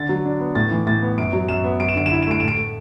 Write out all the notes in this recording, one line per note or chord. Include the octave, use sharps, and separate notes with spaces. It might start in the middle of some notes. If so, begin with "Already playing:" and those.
Already playing: D3 A6
F#3
D4
B3
A2 A6
E3
A2 A6
B3
F#2 D7
F#3
F#2 E7
B3
F#2 D7
E7
D3 D7
E7
E4 D7
E7
A3 D7
A2 E7
D7
A3